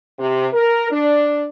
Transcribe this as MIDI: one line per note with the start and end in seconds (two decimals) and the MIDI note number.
0.18 0.46 48
0.52 0.88 70
0.91 1.47 62